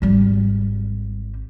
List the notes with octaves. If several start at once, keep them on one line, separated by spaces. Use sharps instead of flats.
G#1 G3